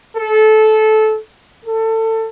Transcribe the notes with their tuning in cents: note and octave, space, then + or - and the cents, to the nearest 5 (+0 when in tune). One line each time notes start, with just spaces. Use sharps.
A4 -20
A4 +25